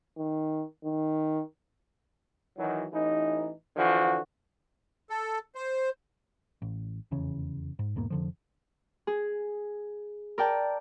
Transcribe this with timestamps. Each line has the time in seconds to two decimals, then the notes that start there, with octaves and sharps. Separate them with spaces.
0.18 D#3
0.84 D#3
2.57 D#3 E3 F#3
2.93 A1 E3 D#4
3.77 D3 E3 F3 F#4
5.10 A4
5.55 C5
6.62 A1
7.11 F1 E2 C#3 C#4
7.79 G#2
7.96 E2 G#2 B2 A#3
8.10 F1 D3 F3
9.07 G#4
10.38 A#4 D5 G5 A5